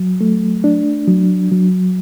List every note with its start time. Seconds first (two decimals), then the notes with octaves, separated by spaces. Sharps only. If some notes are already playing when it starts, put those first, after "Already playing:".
Already playing: F#3
0.21 A3
0.64 D4
1.08 F#3
1.51 F#3